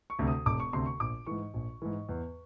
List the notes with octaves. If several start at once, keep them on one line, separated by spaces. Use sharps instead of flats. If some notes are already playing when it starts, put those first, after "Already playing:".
C#6
D2 C3
D#6
E1 D6
C#6
D2 C3 C6
C#6
A#1 D6
G#2 E3 C#6
A#1
G#2 E3
E2